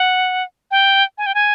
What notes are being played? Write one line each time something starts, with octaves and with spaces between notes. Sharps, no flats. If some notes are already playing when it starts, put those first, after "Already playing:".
Already playing: F#5
G5
G#5
G5
G#5